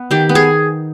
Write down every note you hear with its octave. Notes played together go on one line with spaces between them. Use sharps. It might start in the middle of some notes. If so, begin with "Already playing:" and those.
Already playing: B3
D#3 G4
B3
G#4